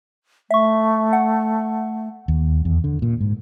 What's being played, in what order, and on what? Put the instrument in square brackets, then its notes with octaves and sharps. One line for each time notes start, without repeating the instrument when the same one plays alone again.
[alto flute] A3 [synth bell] E5 C#6
[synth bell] F#5
[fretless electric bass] D#2
E2
D3
A#2
G#2